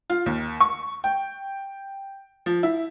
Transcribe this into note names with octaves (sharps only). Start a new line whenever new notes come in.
F4
D#2
C#6
G5
F3
E4